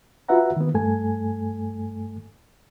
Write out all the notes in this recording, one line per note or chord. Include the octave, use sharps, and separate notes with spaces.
F4 F#4 B4 E5 F#5 A#5
D#3 B3
G2 A3 A4 G#5